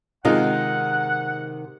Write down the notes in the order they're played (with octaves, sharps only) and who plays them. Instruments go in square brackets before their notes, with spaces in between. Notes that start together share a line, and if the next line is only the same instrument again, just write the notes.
[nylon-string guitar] C3 D#3 [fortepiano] G#3 D#4 F4 [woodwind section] F#5